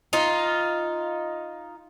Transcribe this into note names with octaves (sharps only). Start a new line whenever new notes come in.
D#4 F4